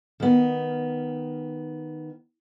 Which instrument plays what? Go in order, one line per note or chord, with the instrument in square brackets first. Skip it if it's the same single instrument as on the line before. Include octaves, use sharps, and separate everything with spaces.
[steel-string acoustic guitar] D#3 B3